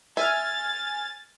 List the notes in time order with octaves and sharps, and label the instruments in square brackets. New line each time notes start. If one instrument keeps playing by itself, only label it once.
[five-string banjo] E5 [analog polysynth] G#5 F6 [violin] A6